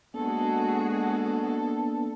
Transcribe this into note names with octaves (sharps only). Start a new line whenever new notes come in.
G#3 A#3 B3 D4 F#4 G#4 A4
A4